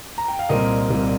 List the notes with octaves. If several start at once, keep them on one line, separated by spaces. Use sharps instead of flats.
A#5
G5
F5
C2 A#2 G3 C4 A#4 D#5
C2 A#2 G3 C4